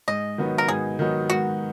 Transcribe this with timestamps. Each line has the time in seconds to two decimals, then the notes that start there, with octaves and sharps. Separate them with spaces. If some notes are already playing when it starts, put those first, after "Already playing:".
0.08 G#2 D#5
0.38 D#3 F#3 B3 D#4
0.58 A#4
0.68 G#2 G#4
0.99 D#3 F#3 B3 D#4
1.30 G#2 F#4